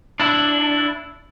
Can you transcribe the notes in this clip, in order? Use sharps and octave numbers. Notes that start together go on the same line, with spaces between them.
D4 E4